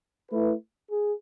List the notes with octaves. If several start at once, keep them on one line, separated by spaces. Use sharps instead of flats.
A3 E4 B4
G#4